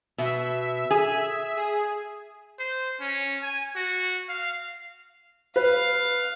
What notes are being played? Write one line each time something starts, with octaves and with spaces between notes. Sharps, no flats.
B2 E5
G#4
G#4
C5
C#4
G#5
F#4
F5
B4 F5